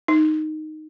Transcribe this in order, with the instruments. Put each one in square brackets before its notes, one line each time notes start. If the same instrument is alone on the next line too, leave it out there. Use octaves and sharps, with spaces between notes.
[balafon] D#4